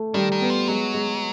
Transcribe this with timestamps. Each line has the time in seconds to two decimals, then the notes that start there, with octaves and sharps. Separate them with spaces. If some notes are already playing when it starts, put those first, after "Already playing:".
Already playing: A3
0.14 D#3 G3
0.32 D#3
0.41 B3
0.50 F3
0.68 F#3 G#3
0.94 G#3